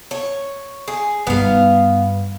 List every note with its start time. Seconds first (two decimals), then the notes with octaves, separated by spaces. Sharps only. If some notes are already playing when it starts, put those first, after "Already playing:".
0.11 C#5
0.88 G#4
1.27 G2 D#3 B3 F5